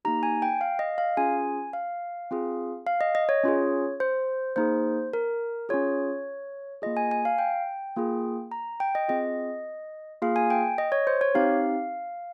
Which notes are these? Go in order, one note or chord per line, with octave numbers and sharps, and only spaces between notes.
A#3 D#4 G4 A#5
G#5
G5
F5
D#5
F5
C#4 F4 G#4 G#5
F5
C4 F4 G#4
F5
D#5
D#5
C#5
C#4 F4 G#4
C5
A#3 D#4 G#4 C5
A#4
C#4 F4 G#4 C#5
A#3 F4 G#4 D#5
G#5
G#5
F5
G5
A#3 F4 G#4
A#5
G5
D#5
C4 F4 G#4 D#5
A#3 F4 G#4 F5
G#5
G5
D#5
C#5
C5
C#5
C4 D#4 G4 F5